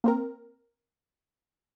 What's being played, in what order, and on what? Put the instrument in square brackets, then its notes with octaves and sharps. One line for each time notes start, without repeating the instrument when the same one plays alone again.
[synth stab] A#3 C4 A#4